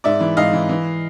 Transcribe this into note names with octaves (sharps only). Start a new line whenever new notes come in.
G#2 D5 E5
E3
G#2 D#5 F5
E3
E3